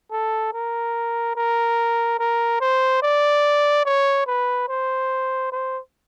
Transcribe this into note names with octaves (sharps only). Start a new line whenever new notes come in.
A4
A#4
A#4
A#4
C5
D5
C#5
B4
C5
C5